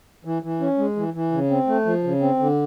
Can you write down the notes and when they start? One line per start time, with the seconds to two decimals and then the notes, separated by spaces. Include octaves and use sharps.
0.25 E3
0.42 E3
0.60 C#4
0.78 G#3
0.96 E3
1.14 E3
1.32 C#3
1.50 C4
1.67 A3
1.86 F3
2.03 C#3
2.21 C4
2.39 D3